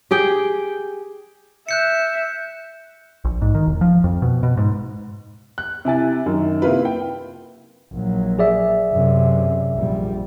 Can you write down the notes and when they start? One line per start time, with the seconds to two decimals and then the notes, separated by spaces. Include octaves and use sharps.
0.11 G4 G#4 G5
1.69 E5 F#6 G6 C#7
3.25 A#1
3.42 G#2
3.55 D#3
3.66 E1
3.81 F3
4.04 F2
4.22 B2
4.43 B2
4.57 G#2
5.58 F#6
5.85 C3 E4 G#5 A6
6.26 F#2 D#3
6.62 C3 A#3 E4 F4 B4
6.85 G5
7.93 A#1 F#3
8.39 G#4 D5 E5
8.93 F#2 C3
9.75 A#1 G3